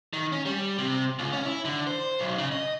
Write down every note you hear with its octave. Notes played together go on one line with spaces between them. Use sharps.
D#3
C#4
G3
C3
C#2
C#4
E4
D3
C5
B1
C#3
D#5